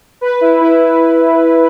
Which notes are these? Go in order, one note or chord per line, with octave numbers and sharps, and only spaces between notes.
B4
E4
E4